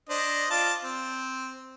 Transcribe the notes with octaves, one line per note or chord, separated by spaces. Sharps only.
D4 C5 D#5
F4 D5 A5
C4